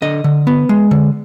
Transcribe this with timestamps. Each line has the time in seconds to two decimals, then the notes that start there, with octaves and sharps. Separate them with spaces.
0.02 D3 D#5
0.24 D3
0.47 B3
0.69 G#3
0.91 D3